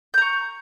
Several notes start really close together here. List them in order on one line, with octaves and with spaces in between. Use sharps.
G6 A#5 C#6